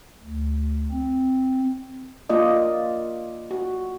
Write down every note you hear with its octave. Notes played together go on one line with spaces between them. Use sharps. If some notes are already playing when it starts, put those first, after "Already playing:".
D2
C4
A#3 F4 D5 D#5
F#4